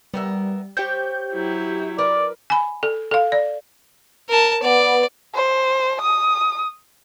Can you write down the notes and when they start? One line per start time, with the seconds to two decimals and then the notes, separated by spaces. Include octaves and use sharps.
0.14 G3 B3 A#4 E5
0.77 G4 C5 C#5 G5 G6
1.33 F#3 E4
1.98 A#4 B4 D5
2.50 G#5 B5
2.83 A4
3.11 A4 F5
3.32 D5
4.29 A#4 A5
4.63 B3 D5
5.35 C5
6.01 D#6